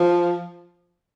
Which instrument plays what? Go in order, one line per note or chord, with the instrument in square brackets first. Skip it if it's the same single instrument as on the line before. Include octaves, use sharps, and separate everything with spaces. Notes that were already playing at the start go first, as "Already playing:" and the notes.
Already playing: [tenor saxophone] F3